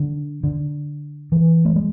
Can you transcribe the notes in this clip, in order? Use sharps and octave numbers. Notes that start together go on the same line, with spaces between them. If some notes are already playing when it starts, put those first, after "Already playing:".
Already playing: D3
D3
E3
A3
G#3